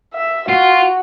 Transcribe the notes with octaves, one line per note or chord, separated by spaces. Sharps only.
E5
F4 F#4